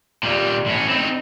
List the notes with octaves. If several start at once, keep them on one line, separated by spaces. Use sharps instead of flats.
A#2 G3
A2 C#4
C4 D#4